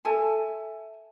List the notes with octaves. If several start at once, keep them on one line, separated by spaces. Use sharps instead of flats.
A4 E5 G#5 A5